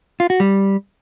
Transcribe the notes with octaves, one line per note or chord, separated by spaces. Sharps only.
F4
F#4
G3